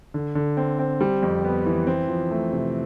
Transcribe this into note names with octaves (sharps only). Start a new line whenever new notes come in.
D3
D3
C4
C4
G3
F2
B3
E3
C4
F3
A3
C3